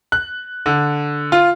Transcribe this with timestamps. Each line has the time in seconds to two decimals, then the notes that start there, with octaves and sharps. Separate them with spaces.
0.12 F#6
0.66 D3
1.32 F4